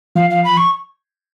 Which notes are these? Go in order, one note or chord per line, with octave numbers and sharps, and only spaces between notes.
F3 F5
F5
B5
C#6